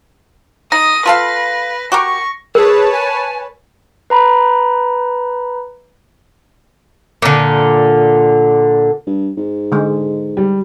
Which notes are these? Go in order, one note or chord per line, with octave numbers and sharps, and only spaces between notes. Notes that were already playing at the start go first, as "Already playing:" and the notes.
D#4 D#6 A#6
F4 A4 B4 F5
F#4 G4 A#4 C#6
G#4 A#4 B4 C#5 A5
G#5
B4 A#5 B5
A#2 D3
G2
G#2
D3 G#3
G3